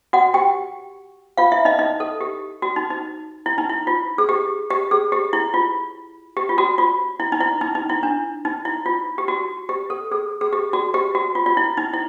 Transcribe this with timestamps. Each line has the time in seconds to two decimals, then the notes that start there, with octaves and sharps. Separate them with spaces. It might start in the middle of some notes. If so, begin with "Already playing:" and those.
0.13 F#4 F#5
0.34 G4 G5
1.37 F4 F5
1.52 E4 E5
1.65 D#4 D#5
1.79 D#4 D#5
2.00 A4
2.21 G4
2.62 F#4
2.76 D#4
2.90 D#4
3.46 E4
3.58 D#4
3.69 E4
3.87 F4
4.18 G#4
4.29 G4
4.70 G4
4.91 G#4
5.12 G4
5.33 E4
5.54 F4
6.37 G4
6.49 F4
6.58 F#4
6.78 F4
7.20 E4
7.32 D#4
7.40 E4
7.61 D#4
7.75 D#4
7.89 E4
8.03 D4
8.45 D#4
8.65 E4
8.86 F4
9.18 G4
9.28 F#4
9.69 G4
9.90 A4
10.11 G#4
10.41 G#4
10.53 G4
10.73 F#4
10.94 G4
11.15 F#4
11.35 F4
11.46 F4
11.57 E4
11.77 D#4
11.93 E4